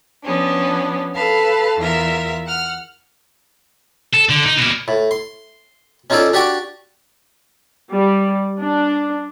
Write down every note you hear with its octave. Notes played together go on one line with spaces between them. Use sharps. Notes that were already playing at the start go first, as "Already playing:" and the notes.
F3 B3 C#4 D4
A4 B4 F5 A5
E2 F4 A#4 E5
F#5 F6
A4
D3
D#4
B2 A#3
A2
C6
C#4 D#4 F4 G#4 A4 D5
D4 F#4 G4 D5 C#6 D6
G3
D4